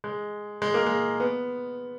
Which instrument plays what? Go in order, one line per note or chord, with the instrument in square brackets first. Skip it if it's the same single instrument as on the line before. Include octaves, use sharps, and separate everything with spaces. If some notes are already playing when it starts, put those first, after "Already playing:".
[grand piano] G#3
G#3
A#3
G#3
B3